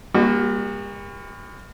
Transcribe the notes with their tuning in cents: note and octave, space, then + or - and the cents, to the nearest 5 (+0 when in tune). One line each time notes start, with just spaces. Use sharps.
G3 +45 A#3 +25 F#4 +0